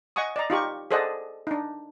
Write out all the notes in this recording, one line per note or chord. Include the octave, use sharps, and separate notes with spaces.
D#5 F#5 G#5 C#6 D#6
D5 D#5 A#5
D#4 F4 G4 C#6
G#4 A4 C5 D5 D#5 F#5
D4 D#4